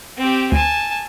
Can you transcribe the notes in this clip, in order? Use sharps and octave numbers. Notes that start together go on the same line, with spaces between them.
C4 G4
D2 G#5 A5